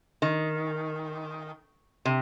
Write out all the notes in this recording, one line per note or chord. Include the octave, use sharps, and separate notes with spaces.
D#3
C3